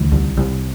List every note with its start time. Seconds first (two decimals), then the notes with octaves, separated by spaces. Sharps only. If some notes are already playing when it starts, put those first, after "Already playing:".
Already playing: D2 D#3
0.12 C2
0.37 C2